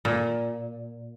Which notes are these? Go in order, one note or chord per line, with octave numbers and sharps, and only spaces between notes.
A#2